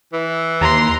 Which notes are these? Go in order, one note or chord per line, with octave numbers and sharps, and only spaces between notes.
E3
D#2 A#5 C6